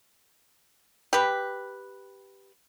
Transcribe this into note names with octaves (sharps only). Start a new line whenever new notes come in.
G4 B4